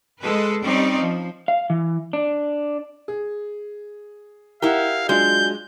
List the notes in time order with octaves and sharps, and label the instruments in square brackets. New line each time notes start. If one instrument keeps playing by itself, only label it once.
[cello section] G#3 A4 B4
G3 C4 C#4 D#4 D5
F3
[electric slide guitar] F5
E3
D4
[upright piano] G#4
[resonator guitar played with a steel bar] E4 G4 [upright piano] A#4 F#5 [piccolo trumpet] F5
[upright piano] F#3 D4 F4 [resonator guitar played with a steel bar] G#3 [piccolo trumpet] G6